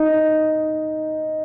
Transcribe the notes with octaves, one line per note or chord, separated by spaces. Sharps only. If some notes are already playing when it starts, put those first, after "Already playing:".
Already playing: D#4